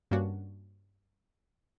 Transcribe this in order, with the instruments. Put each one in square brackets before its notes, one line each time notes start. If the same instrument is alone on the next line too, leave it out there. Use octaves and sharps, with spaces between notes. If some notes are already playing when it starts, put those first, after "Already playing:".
[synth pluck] G2 A#3 C#4 D4 F#4